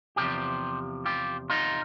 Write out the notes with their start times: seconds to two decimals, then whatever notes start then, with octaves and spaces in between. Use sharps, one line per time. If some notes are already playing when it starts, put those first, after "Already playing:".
0.16 E2 C3 F3 F4 G4
1.06 F4 G4
1.50 D#4 F4